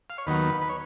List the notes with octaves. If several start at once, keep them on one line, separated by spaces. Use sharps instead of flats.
F5
C#5
D#2 D#3 F#3 B3 B4
B4
C#5